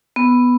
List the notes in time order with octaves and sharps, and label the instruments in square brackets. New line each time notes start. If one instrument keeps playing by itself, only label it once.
[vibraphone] B3